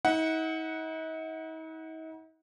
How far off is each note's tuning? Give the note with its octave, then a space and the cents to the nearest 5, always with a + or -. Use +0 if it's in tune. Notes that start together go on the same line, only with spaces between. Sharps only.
D#4 +45 F#5 +0